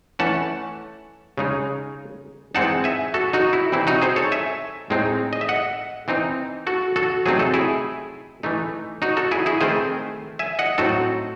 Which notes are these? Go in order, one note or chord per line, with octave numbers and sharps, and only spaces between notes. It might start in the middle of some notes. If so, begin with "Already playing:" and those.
E3 A3 C#4 F#5 A5
C#3 G#3 D#4
E3 G#3 C4 D#4 F#5 A5
E5 G#5
F#4 A4
D#4 F#4
E4
C3 E3 C4 D#4 E4
D#4 F#4
G#4 C5
A4 C#5
E5 G#5
A2 G#3 C4 D#4
D#5
E5
D#5 F#5
E3 C4 D#4
F#4 A4
F#4 A4
C3 F#3 A3 C4 D#4 G#4
A4
E4 G#4
E3 A3 D#4
D#4 F#4
F#4 A4
E4 G#4
E4 G#4
D#3 A3 C4 G#4 C5
E5 G#5
D#5 F#5
A2 F#3 C4 D#4 F#4 A4